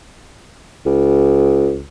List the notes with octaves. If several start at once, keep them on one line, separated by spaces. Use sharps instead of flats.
C#2